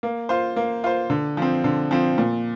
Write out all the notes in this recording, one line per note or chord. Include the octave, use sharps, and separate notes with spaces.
A#3
F4 C5
A#3
F4 C5
D3
F3 C4
D3
F3 C4
A#2